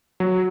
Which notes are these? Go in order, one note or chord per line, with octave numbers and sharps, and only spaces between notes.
F#3